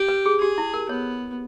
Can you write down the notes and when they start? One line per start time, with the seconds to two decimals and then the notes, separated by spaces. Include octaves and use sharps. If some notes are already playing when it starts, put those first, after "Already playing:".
Already playing: G4
0.08 B4
0.26 G#4
0.41 G4 G#4
0.58 E4
0.74 A#4
0.89 B3 C#5